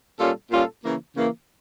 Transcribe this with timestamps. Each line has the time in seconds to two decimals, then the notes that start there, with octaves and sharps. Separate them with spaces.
0.19 A#2 G3 C#4 F4 A4
0.51 A#2 G3 C#4 F4 A4
0.83 C#3 E3 A#3
1.15 C#3 E3 A#3